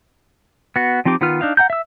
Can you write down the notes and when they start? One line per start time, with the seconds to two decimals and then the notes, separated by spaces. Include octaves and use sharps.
0.76 B3 F#4
1.05 F3 C4 D#4 G4 D6
1.21 D#3 B3 F4 B4 F6
1.41 D4 D#4 F5
1.57 F#5 G5 A#5 G6
1.70 E5 E6